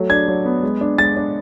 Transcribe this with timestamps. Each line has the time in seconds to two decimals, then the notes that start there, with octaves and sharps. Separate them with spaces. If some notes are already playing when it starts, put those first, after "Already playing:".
Already playing: F#3 A3
0.10 D4 G#6
0.28 F#3
0.46 B3
0.63 G#3
0.81 D4
0.98 G#3 A6
1.17 D4